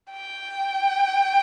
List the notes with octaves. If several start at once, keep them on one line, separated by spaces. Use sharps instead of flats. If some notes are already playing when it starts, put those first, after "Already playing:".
G5